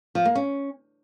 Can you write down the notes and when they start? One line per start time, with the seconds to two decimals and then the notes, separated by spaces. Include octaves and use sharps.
0.15 F3
0.25 A#3
0.36 C#4